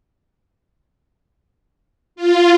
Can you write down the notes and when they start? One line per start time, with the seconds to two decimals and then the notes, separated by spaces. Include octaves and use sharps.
2.16 F4